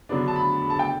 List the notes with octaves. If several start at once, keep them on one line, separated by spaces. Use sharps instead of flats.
D3 F#3 B3 D4
A5
B5
B5
A5
G5